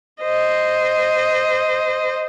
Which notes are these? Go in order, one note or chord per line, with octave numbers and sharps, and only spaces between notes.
C5 D#5